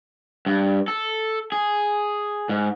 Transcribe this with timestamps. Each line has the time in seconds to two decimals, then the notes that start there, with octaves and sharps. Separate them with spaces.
0.46 G2
0.88 A4
1.52 G#4
2.49 G#2